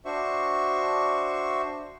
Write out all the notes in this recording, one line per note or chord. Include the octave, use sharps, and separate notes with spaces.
D4 F#4 C5 E5 C#6